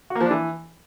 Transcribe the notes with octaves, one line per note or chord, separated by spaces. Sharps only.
F#4
A#3
F3
D4
E3